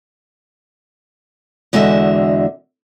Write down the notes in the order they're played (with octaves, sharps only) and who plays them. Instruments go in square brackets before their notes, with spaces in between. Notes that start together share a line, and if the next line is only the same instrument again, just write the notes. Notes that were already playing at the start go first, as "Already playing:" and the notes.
[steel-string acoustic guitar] E2 D3 G#3 F#4 D#5 E5